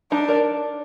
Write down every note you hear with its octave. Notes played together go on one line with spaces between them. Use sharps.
D4 D#4
A#4 D5